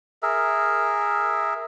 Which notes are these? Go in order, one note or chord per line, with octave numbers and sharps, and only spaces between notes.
G#4 A#4 E5